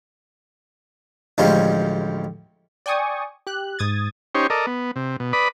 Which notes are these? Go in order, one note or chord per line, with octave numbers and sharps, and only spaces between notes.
A1 D2 F3 G3 G#3 C#4
D5 G5 G#5 C#6 D#6
G4 F#6
G#2 D#6 G#6 A6
C#4 D#4 G4 C5 C#5
A4 A#4 D5 D#5
B3
C3
B2
B4 D5 B5 D#6